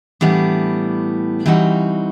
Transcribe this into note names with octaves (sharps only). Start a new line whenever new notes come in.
A2 E3 G3 B3 D4
E3 G3 C4 D#4 F#4